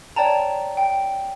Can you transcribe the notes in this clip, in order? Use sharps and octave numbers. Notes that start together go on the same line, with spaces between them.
C#5 D5 G5 A5 A#5
G5